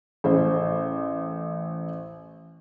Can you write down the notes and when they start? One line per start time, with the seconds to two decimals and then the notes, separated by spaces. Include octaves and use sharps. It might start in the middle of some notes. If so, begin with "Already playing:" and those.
0.24 A1 C5